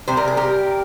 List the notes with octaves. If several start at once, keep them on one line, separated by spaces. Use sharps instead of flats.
C3 G3 C5
A#4
G#4
G4 A#4